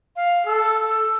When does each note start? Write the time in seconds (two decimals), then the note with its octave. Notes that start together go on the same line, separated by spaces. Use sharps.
0.16 F5
0.47 A4 E6